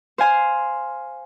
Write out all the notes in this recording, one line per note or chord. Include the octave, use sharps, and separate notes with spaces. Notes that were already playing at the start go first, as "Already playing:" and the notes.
C5 F5 G#5 C6